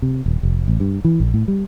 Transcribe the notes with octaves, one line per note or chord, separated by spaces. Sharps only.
C3
D#1
F1
A1
G2
E3
A#1
A2
G3